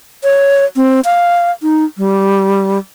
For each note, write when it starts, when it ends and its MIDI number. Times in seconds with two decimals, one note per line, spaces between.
0.24 0.65 73
0.76 1.01 60
1.05 1.51 77
1.63 1.85 63
1.98 2.78 55